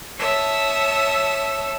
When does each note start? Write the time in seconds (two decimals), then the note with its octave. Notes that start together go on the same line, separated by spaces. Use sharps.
0.19 C#5 E5 A5 D#6